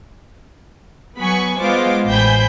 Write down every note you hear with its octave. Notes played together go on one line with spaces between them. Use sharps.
F#3 B3 G#5 B5 C#6
G#3 B3 F4 C5 D6
A1 C5 G5 G#5 B5 G6